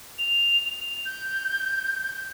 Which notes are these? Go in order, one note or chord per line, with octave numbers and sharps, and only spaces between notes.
F7
G6